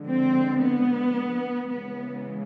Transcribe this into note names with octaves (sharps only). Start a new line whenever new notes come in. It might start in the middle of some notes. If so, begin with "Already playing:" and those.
Already playing: D3 F3 G#3
C4
B3
C#3 E3 G#3 B3